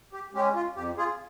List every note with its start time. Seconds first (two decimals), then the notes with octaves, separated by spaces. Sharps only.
0.13 G4
0.34 G#3 C#4 G4
0.55 F4
0.76 F2 G4
0.98 F4 G#4